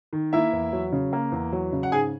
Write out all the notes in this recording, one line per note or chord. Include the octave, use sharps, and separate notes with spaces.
D#3
A#3 E4 E5
E2
F#3
C#3
A#3
E2
F#3
C#3
F#5
G#2 G#4 G#5